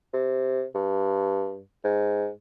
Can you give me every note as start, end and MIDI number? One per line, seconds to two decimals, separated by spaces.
0.13 0.64 48
0.75 1.60 43
1.84 2.29 44